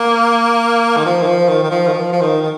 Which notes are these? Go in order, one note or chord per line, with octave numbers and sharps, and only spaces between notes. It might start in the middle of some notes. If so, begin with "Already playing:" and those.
Already playing: A#3
D#3
F3
D#3
F3
D#3
D#3
F3
D#3
F3
F3
D#3
D#3